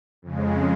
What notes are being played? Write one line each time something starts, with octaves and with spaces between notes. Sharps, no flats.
F2 C#3 G#3